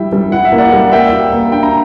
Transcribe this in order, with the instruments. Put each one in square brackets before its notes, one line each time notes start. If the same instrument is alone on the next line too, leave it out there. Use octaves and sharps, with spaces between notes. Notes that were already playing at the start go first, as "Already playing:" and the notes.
Already playing: [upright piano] G3 E4 [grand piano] E5 G5
[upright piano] G3
[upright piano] E4 [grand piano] F#5
[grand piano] E5
[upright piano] A#3
[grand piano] D5 F#5
[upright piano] G3
[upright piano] A#3 [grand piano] E5 G5
[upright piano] F#4
A#3
[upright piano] D4 [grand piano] G5
[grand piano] A#5